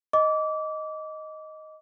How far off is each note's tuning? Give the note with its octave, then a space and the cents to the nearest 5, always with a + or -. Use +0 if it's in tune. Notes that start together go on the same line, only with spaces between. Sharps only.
D#5 +5 D6 -25